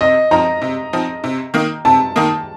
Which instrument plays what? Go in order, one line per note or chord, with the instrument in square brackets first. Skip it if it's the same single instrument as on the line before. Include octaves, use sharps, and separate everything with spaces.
[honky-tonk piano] C3 [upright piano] D#5
[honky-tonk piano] F3 C4 D#4 [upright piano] A#5
[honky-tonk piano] C3
F3 C4 D#4
C3
D#3 A#3 D#4
[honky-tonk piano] C3 [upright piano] A5
[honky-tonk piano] D#3 A#3 D#4